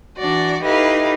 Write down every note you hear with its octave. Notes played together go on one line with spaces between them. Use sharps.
E3 D4 F#4 D5
D#4 E4 G4 A4 B4 F5